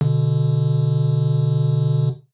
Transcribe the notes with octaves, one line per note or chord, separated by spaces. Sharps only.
B2 D3